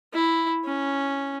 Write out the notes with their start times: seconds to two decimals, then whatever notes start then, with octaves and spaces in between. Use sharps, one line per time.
0.14 E4
0.64 C#4